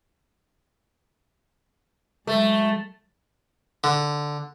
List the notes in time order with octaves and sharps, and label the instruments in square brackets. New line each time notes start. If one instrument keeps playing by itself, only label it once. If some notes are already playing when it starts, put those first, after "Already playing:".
[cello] F#3 G#3 [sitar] A3
[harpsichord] D3